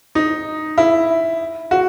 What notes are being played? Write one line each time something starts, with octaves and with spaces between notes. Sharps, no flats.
D#4
E4
F#4